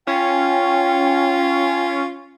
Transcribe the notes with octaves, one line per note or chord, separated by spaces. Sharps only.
C#4 F4 G5